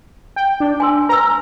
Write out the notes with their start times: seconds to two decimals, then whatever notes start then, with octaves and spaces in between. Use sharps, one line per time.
0.36 G5
0.60 D4
0.80 G#5 C6 E6
1.09 B4 G#5 A#5 E6